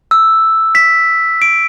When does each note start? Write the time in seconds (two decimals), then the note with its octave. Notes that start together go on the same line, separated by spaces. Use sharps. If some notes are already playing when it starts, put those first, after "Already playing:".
0.11 E6
0.75 B6
1.42 D7